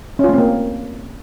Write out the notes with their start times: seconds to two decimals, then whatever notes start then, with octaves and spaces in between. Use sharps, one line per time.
0.19 C#4
0.24 F4
0.29 A3
0.33 C4
0.38 A#3